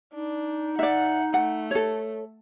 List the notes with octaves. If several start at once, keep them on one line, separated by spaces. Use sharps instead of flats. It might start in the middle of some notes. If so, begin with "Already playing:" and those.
D4 D#4
D5 E5 F#5
A3 F#5
A4 C#5